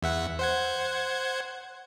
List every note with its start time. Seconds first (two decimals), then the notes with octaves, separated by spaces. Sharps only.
0.03 E2 E5 F#5
0.39 C5 F#5 G#6